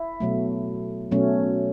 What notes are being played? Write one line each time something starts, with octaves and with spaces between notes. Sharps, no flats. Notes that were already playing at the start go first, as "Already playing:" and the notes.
Already playing: E4
B2 F#3 A3
B2 F#3 A3 C#4